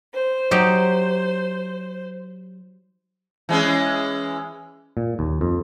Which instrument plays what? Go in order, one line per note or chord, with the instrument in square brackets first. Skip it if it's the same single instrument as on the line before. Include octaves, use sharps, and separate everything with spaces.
[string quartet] C5
[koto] F#3 D#4 G4
[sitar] E3 G#3 C#4
[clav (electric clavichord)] A#2
D#2
F2